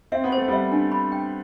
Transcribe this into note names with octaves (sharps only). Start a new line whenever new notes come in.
C4 E5
B3
A3 C5
G3 B3 E5
D4
B5
G5